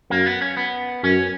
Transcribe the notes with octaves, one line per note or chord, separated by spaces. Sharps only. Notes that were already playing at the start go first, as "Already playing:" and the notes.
F#2 A#3
B3
C#4
B3
F#2 C#4